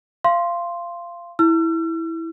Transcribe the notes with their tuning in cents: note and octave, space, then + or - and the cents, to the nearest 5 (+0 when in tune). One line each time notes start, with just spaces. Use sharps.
F5 -20 C6 +0
E4 -10 E6 +45